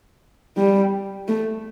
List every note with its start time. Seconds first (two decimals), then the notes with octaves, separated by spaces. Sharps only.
0.57 G3
1.28 A3